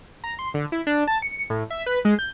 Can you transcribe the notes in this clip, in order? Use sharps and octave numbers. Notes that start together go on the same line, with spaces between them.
A#5
C6
D3
E4
D4
A5
C#7
A2
E5
B4
G#3
G6